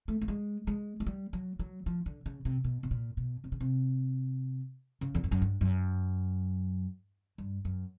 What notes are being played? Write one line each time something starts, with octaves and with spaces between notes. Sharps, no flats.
A3
A3
G#3
G#3
G#3
G3
F#3
F#3
F3
D3
C#3
C3
B2
B2
A#2
B2
C3
C#3
C3
C#3
E2
F2
F#2
G2
F#2
G2
F#2